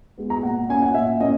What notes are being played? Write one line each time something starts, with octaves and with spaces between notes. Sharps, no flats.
G#3 B3
A#5
A#2 F#5
A#3 C#4 G#5
F#5
A#2 E5
A#3 C#4 D#5